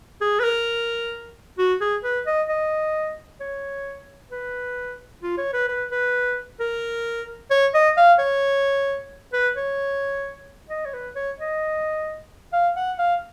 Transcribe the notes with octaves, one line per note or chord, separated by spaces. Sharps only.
G#4
B4
A#4
F#4
G#4
B4
D#5
D#5
C#5
B4
F4
C#5
B4
B4
B4
A#4
C#5
D#5
F5
C#5
B4
C#5
D#5
C#5
B4
C#5
D#5
F5
F#5
F5